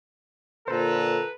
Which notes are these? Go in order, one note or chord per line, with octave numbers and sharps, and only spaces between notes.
A#2 D3 A4 B4 C5 A#5